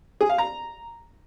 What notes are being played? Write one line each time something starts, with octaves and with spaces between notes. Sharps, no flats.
G#4
F5
A#5